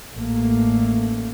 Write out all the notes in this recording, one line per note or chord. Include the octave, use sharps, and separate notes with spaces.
A1 A3 A#3